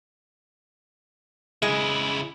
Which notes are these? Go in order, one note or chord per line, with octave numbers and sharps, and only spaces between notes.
C#3 G#3 E4